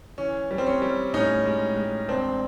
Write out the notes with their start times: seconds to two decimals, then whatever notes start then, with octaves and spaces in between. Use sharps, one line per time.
0.18 E3 C#4
0.51 G3
0.58 C4
0.66 C#4
0.82 G3
1.13 A2 C#4 D#4
1.46 G#3
1.76 G#3
2.08 E1 C4 D4